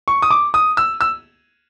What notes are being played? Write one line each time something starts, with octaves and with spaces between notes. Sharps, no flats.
C#6
D#6
D6
D#6
E6
E6